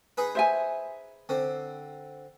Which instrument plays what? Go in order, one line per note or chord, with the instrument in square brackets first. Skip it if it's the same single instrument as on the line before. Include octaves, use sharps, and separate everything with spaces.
[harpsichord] D#4 G#4 B4
[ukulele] C5 E5 G#5
[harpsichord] D3 C4